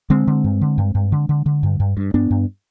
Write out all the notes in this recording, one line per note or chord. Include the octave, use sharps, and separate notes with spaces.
D3 G#3 C4
D3
G2
D3
G2
G2
D3
D3
D3
G2
G2
G2
G2 B3 D4
G2